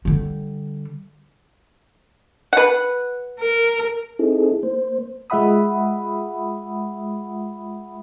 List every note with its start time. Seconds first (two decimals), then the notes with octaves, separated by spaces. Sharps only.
0.05 D3 G3
2.53 B4 F#5
3.40 A#4
4.19 C4 D#4 E4 G#4 A4
4.63 A#3 C5
5.30 G#3 F4 E5 F#5 B5 D#6